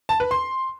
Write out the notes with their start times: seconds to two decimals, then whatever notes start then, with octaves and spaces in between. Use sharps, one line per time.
0.09 A5
0.20 B4
0.31 C6